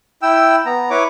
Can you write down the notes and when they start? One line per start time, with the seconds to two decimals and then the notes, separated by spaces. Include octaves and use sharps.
0.23 E4 G5 E6
0.66 B3 A#5
0.90 E4 B4 C#5 D6